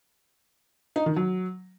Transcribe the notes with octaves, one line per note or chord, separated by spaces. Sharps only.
D#4
D#3
F#3